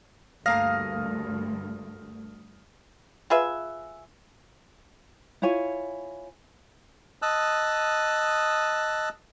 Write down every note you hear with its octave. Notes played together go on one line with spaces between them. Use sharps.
D2 G2 A3 A#3 F5 D#6 F6 A#6
F4 G#4 B4 E5
E4 F4 C#5 G#5
D#5 A5 D#6 E6 F#6